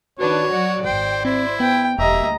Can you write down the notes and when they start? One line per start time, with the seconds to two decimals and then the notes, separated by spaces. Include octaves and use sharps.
0.19 D#3 D4 F#4 B4 C#5
0.52 F#3 F#4 D5
0.85 G#1 C5 G5
1.25 C4 E4 C5
1.60 B3 G5
1.99 E1 D2 G3 A#3 D#5 E5 A#5